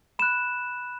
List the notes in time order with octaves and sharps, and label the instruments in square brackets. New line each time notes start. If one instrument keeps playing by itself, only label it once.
[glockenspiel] B5 F#6 E7